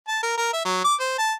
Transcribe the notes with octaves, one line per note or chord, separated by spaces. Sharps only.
A5
A#4
A#4
E5
F#3
D6
C5
A5